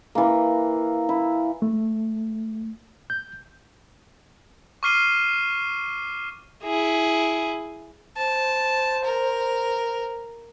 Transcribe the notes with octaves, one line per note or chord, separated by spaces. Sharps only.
E3 A#3
E4
A3
G6
C#6 D6 F6 C7 D#7 G7
E4 G#4
C5 A5
A#4